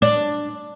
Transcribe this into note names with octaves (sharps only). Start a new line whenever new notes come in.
D4